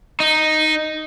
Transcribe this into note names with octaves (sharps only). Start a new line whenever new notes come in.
D#4